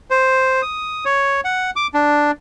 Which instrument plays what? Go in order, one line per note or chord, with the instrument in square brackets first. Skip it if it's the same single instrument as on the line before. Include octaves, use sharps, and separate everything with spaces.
[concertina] C5
D#6
C#5
F#5
D6
D4